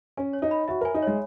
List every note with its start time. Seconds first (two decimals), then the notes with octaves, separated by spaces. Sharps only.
0.17 C#4 G#5
0.33 C#5
0.42 D#4
0.51 B5
0.68 F#4 E5
0.81 A#4 G#5
0.94 D#4
1.03 G#3 C#5